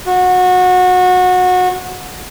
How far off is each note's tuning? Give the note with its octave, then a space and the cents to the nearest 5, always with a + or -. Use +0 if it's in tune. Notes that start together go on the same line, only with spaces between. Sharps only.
F#4 -25